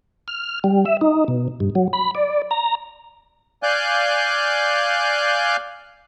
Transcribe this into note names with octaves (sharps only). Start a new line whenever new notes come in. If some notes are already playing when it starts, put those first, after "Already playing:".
F6
G3
E5
D#4
B2
G2
F#3
B5
D5
A#5
D5 F5 G#5 F#6 G6